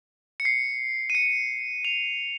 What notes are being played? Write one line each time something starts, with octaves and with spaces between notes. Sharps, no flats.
C#7
C7
D#7
C#7
F7